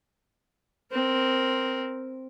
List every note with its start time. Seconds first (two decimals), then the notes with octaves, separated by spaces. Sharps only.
0.92 C4 A#4